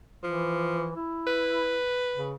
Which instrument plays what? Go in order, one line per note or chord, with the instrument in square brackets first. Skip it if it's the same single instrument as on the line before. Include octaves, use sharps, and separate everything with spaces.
[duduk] E3 [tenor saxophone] F3
[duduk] E4
[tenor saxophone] B4
[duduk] C#3